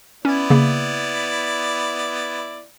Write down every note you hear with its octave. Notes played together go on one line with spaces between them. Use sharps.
B3 C#4 E4 D5 G#6
C#3 A#3